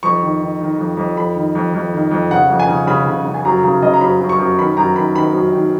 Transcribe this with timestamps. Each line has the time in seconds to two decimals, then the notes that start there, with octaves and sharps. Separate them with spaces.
0.03 F2 C#6
0.22 D#3
0.41 D#3
0.60 D#3
0.78 F2
0.97 F2
1.17 F2 B5
1.35 D#3
1.55 F2
1.74 F2
1.93 D#3
2.11 F2
2.31 C#3 F#5
2.50 F2
2.60 G#5
2.68 C#3
2.87 C#3 B5
3.06 C#3
3.25 C#3
3.34 G#5
3.45 F#2 A#5
3.63 C#3 A#5
3.82 C#3 D#5
3.94 A#5
4.01 F#2 B5
4.21 F#2
4.29 C#6
4.39 F#2
4.59 D#3 B5
4.77 F#2 A#5
4.96 D#3 B5
5.15 D#3 B5
5.34 F#2
5.53 D#3